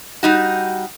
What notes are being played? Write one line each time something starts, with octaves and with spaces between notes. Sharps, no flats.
G3 D#4 F#4